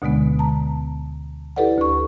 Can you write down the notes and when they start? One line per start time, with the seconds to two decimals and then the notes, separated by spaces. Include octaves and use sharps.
0.02 D2 B2 D3 G#3 B3
0.39 A5 A#5
1.56 E4 G4 A4 B4 D5 F#5
1.78 D2 C#6